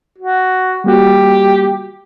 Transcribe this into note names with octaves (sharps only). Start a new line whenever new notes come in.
F#4
G3 A#3 F#4 G4